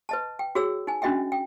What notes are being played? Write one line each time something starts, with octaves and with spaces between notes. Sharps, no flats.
B4 D#5 A5
G5
F#4 G#4 C#5 E6
D#4 G#5
C#4 D4 F#4 D#5 E5 G5
G5